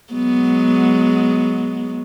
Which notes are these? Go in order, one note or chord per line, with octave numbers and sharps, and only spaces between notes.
F#3 G#3 B3